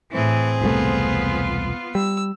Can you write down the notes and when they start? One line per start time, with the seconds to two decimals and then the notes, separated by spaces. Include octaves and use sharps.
0.12 A2 E3 C4 G#4
0.61 E1 C2 A3 B3 F4
1.95 G3 E6